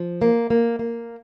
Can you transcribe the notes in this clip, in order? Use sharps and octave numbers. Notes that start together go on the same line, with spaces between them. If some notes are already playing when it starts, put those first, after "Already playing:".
Already playing: F3
A#3
A#3
A#3